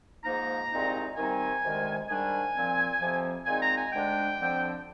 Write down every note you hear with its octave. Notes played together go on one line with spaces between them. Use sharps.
G#2 F3 A#3 D#4 A#5
C2 A#2 G#3 C4 D#4
C3 D#3 G3 C4 D#4 G#5
D2 C3 D#3 G#3 D#4
G#2 D#3 G3 D4 G#5
A#2 F3 C4
F2 C3 F3 C4
A#2 G#3 C4 D#4 G#5
A#5
G#5
D2 D3 G#3 D4 G5
F2 D3 F3 C4